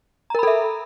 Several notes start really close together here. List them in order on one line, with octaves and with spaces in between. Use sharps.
A#5 A#4 B5 A4 E5